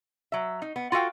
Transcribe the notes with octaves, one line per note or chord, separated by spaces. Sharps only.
F#3 E5
D#4
B3
F4 F#4 A4 F5 G5